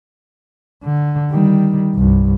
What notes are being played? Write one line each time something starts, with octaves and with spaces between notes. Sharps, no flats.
D3
D#3 G3
C2 G2